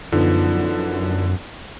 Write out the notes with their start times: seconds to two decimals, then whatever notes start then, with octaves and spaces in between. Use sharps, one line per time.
0.12 F#2 D3 F3 B3 D#4